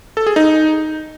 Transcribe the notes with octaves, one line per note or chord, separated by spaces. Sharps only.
A4
G#4
D#4